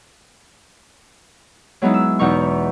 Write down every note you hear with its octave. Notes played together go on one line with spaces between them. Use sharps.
F#3 G#3 B3 D#4 E4
E6
E2 B2 E3 D#4 C#6